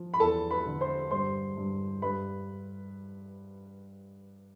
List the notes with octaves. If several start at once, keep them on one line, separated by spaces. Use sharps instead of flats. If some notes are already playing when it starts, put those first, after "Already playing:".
Already playing: F3
B5
E2 A4 A5
B4 B5
D3
C5 C6
G2 C5 C6
G2
G2 B4 B5